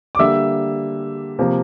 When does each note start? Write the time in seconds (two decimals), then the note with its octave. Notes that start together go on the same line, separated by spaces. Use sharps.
0.15 D6
0.19 D3 G3 A#3 E5 E6
1.39 C3 F3 A#3